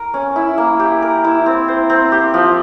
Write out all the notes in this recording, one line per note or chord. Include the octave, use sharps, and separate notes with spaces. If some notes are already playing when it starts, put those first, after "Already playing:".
Already playing: A#4
C#4
E4
A#3
G4
A#4
E4
C4
C5
C4
G4
F3